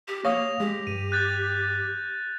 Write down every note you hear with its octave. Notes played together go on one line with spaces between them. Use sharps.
G4
A#3 C#5 F5 D#6 A#6 F7
G#3 G4
G2 D#7
F#6 G6 A6